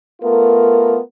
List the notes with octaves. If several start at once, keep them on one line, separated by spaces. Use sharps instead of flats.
A3 B3 F4 A#4